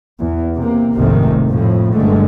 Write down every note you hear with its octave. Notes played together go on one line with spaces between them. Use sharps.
E2
C3 A#3
F1 C2 G#2 C3 D#3 A3
F2 A2 F3
F#1 G2 D3 G#3 A3